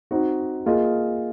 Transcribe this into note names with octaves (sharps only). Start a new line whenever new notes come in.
C4 D#4 F#4
A#3 F4 G#4 D#5